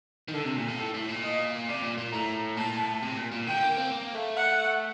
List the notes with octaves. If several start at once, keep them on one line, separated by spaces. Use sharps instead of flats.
D#3
D3 A4
C3
A#2
C3
A2 A4
A2
A#2
D#5
C3 D5
A#2
A#2
A2 A#5
A#2 A5
A2
C3
A#2
A#2
D3 G5
A#3
C4
A#3
A3
F#5